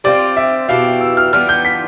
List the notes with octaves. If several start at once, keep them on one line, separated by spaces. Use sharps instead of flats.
G3 C4 F4 D5
E5
B2 B3 E4 G4 F5
E6
F6
E3 G3 B3 F4 F6
G6
B6